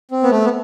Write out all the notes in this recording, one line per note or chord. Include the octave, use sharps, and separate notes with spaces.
C4
B3
A3
B3